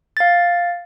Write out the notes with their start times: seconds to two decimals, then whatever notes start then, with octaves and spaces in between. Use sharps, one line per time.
0.17 F5 A6